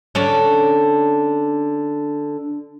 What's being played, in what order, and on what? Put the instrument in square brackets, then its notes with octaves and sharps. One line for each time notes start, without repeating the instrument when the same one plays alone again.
[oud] D3 C#4 D4